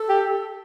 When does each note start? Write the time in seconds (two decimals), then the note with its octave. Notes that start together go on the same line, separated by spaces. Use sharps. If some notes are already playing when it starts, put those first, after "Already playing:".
Already playing: A4
0.09 G4